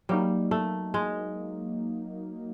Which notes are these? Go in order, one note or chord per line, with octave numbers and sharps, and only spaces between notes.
F#3 G3 A#3 D#4
A3
G#3